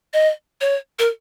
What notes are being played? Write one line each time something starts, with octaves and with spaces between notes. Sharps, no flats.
D#5
C#5
A#4